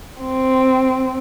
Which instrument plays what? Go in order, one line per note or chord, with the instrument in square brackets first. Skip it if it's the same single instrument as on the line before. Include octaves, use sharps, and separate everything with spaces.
[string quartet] C4